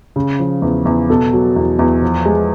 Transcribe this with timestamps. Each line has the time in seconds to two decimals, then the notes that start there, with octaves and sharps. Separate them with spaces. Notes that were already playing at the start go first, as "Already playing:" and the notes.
0.16 C#3
0.39 F3
0.62 E2
0.85 E2
1.10 B2 A4
1.33 F#3
1.56 E2
1.79 E2
2.02 F3
2.25 G#3